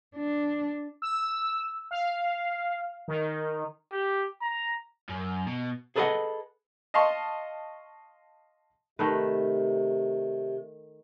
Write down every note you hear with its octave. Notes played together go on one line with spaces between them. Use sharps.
D4
E6
F5
D#3
G4
A#5
F#2
B2
G#4 A4 B4 C5 D#5 F#5
D#5 F5 A5 C6 C#6
C3 D#3 A3 B4